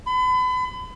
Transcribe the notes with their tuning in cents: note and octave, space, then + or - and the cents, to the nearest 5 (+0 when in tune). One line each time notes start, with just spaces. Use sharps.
B5 +35